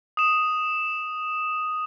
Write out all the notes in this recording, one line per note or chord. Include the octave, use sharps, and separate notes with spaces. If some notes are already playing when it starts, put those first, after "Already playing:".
D#6 E7